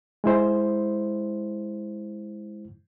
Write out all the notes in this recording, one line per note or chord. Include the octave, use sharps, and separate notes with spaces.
G#3 E4 C5